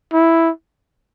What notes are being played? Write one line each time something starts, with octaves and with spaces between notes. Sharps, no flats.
E4